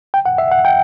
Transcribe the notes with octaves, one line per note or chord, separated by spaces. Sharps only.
G5
F#5
E5
F#5
G5